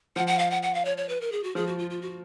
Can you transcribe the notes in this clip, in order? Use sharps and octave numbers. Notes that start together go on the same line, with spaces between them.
F3 F#5
F#5
F5
F#5
F#5
F5
C#5
C#5
B4
A#4
G#4
F#4
F3 G#4
F#4
F4
F4
F#4